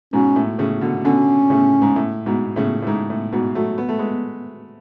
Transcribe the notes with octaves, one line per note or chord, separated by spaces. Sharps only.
G#2 B2 C#4
A2
A2 C#3
B2 D3
B2 D3 C#4
A2 C#3
G#2
A2
G#2 B2
A2 C#3
A2
G#2
A2
G#2 B2
F#3 A3
B3
A3
G#3 B3